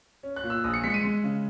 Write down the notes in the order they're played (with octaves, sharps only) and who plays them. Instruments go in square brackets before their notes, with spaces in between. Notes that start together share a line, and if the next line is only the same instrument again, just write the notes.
[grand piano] C#4
F#6
A#2
E6
A#1 D#6
C#7
G#3 B6
C#7
D#7
G#3
C#3